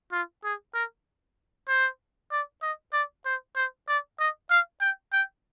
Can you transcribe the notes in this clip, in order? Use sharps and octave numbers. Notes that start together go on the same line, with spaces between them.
F4
G#4
A#4
C5
D5
D#5
D5
C5
C5
D5
D#5
F5
G5
G5